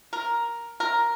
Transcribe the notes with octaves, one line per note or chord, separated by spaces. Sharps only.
A#4
A#4